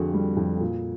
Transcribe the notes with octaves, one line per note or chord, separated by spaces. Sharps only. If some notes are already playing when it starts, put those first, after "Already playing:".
Already playing: F2 D3 F#4 G#4
G3
F2
A#2